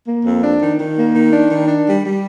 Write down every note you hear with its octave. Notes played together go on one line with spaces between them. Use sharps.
A#3
F2
D4
D#3
D#3
A#3
D#3
D4
D#3
D4
G3
G3